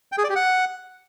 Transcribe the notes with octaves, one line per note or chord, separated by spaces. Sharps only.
G5
G#4
D5
G4
F#5